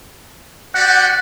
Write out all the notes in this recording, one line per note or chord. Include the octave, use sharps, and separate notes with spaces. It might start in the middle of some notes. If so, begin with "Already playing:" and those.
F#4 G4 D5 F#5